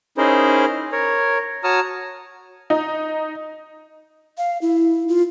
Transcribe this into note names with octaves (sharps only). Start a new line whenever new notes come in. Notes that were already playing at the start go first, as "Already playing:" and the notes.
C#4 D#4 E4 G#4 A#4 C5
A#4 C#5
F#4 C#5 A5 A#5 D#6 F6
D#4
F5
E4
F4